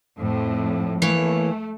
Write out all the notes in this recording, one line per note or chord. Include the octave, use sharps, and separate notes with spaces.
F2 A2
E3 A3 A#3 C#5